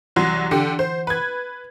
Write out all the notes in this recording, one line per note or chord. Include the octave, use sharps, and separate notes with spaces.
C2 E3 F#3 F#5 C6
D3 G4
C5
B4 G#6